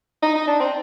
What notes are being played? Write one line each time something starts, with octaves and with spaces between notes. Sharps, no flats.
D#4
D#4
D4
C4